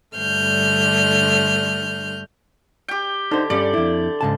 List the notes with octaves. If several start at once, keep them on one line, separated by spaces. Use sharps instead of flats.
G2 D3 A3 F6 G6
G4 G5
D3 D#4 C5
G2 G3 C#4 D5
F2 E4
G#2 C#3 A5